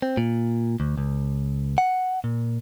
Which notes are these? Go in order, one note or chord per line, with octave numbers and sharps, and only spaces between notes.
C4
A#2
D2
C#2
F#5
A#2